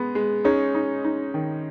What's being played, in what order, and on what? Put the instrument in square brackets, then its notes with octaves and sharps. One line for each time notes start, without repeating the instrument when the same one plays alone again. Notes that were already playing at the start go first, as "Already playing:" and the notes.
Already playing: [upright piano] G#3 B3
G#3
[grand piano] G#3 C#4 [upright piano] D#4
[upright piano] D#4
D#4
D#3